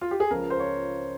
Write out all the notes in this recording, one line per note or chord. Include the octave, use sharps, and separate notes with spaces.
F4
G4
G#4
C#2 C#3 F3 A#4
C5
C#5